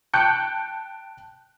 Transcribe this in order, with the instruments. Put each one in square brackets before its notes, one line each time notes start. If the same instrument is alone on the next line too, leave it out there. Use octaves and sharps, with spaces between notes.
[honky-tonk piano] G5 A5 F#6 G6 C#7